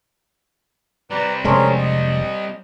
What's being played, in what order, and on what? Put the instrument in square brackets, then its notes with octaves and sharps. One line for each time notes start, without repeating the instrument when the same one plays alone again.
[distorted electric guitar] G3 C4 [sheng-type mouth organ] B4 D5 A#5
[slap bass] F1 G#3 [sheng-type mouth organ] C#4 G#4 A#4 [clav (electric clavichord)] D4 C5
[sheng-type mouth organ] D#5